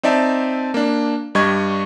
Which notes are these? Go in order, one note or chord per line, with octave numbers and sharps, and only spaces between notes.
C4 D#4 D5 E5 A5
A#3 D4
G2 G3 D#5 C#6 G#6